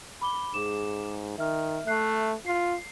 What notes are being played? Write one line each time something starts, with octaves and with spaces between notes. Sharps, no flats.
B5 D6 G7
G#2 G#4 D6 E7
D#3 E5 F6
A3 E5 F#6 C7
F4 C7